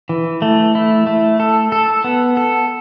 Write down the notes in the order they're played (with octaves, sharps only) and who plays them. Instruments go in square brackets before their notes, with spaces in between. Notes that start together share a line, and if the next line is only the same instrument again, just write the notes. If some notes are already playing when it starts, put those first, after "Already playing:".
[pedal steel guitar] E3
A3
E4
A3
A4
A4
B3
A4